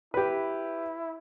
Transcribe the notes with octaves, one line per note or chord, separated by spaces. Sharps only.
E4 G4 B4